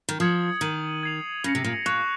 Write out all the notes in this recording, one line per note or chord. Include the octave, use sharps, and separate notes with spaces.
D#3
F3 D#6 G#6 C#7 F#7
D#3 G#6 D#7 F#7
G#6 C7 F7
C#3 D#6 A#6 C#7
C3
A#2
A#2 C#6 F#6 C7 F7